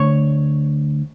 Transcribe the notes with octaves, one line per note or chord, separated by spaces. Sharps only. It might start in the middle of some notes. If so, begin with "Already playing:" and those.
Already playing: D2 C#5